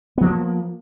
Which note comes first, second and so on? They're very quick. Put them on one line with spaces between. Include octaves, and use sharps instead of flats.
B3 F3 A#3